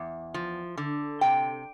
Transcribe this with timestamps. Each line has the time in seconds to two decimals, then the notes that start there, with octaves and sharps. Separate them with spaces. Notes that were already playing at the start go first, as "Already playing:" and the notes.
Already playing: E2
0.34 F3
0.77 D3
1.21 C3 G5